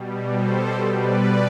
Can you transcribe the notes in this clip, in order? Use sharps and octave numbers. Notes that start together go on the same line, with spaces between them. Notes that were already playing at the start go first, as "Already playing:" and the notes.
Already playing: B2 G3
A4 C5
B4 D5